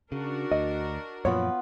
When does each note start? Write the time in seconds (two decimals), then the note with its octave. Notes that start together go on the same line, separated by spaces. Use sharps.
0.12 C#3 D4 F#4 A#4
0.52 D2 D#5
1.25 F#2 A#2 F3 B3 F4 C#5 B5